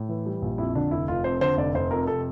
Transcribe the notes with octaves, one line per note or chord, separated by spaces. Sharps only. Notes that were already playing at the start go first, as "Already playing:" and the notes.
Already playing: A2
E3
G3
A#1
F2 E4
D3 D4
F1 E4
F1 F4
F2 C5
D3 C5
F1 D5
F1 C5
F2 A#4
C3 A4